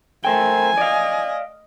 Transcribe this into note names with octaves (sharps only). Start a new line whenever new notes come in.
A3 A#4 C5 G5 G#5
D5 D#5 F5